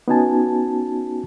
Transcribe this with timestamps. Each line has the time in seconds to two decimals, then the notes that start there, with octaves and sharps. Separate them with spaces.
0.08 B3 C#4 D#4 F#4 G#5 A5